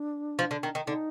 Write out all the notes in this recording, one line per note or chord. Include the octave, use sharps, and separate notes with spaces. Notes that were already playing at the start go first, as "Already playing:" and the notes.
Already playing: D4
F3
D3
D#3
D#3
D3 D#4